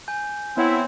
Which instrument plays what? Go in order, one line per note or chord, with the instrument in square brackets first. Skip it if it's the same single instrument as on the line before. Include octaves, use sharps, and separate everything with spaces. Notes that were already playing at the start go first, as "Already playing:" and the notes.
[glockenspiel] G#5 G6
[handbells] B3 C#5 F#5 [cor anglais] C4 [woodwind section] E4